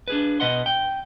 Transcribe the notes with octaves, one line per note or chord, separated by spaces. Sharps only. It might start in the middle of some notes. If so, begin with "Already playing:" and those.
D4 G#4 B4
B2 F3 B4 D#5 F#5 C6
G5